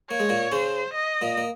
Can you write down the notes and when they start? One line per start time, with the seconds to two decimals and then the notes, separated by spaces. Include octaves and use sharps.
0.10 A#3 C#5
0.20 G#3
0.29 A#2 A#3
0.52 C#3 C#4 C5
0.94 D#5
1.21 A#2 A#3
1.37 A#3